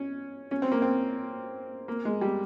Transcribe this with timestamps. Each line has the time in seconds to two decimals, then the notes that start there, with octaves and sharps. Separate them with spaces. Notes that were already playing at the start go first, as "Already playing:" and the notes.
Already playing: C#4
0.51 C#4
0.62 C4
0.72 A#3
0.82 C4
1.88 A#3
2.05 G#3
2.21 G3